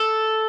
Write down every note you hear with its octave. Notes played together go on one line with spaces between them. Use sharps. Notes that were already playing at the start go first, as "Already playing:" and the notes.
Already playing: A4